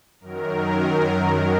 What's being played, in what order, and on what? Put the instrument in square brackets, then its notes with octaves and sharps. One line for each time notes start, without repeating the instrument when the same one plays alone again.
[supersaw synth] F#2 D#3 F#3 A#4